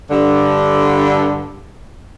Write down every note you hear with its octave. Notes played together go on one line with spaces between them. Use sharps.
G2 D3